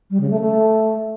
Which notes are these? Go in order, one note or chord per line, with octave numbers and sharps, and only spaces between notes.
G3
C#3
A3
A3